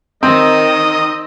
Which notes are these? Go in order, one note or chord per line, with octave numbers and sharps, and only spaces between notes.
D#3 C4 D#5